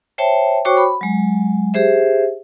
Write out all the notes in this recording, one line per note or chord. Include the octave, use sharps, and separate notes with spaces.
C5 C#5 E5 G5 A5
F#4 C5 C#5 G5 C#6 D6
B5
F#3 G#3
G4 G#4 C5 E5